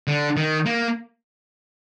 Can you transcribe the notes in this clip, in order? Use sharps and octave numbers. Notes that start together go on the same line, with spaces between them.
D3
D#3
A#3